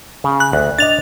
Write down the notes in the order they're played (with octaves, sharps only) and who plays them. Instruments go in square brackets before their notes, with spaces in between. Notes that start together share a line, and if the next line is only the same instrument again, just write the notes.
[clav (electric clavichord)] C#3
[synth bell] F#6
[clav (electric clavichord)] D2
[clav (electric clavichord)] D4 D#5 [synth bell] A6 F7